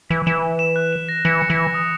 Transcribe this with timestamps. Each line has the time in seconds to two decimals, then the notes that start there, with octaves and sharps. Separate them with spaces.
0.10 E3 B6
0.26 E3 E7
0.43 E7
0.59 E7
0.76 F#6
0.93 E7
1.09 A#6
1.25 E3 C#7
1.41 C#7
1.50 E3
1.57 A#6
1.74 D#6